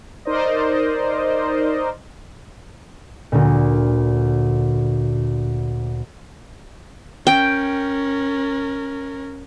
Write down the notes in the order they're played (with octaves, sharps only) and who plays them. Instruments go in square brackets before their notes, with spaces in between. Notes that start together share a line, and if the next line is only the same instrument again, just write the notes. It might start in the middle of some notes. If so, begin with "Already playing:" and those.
[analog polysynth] D#4 A#4 C5 D5 D#5
[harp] D2 A#2
[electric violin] C#4 A#4 [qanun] G5